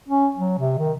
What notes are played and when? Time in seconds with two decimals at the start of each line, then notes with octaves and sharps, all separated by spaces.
0.08 C#4
0.36 F#3
0.59 C3
0.79 D#3